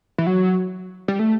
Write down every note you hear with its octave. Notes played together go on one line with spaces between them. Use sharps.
E3
F#3
G3
A3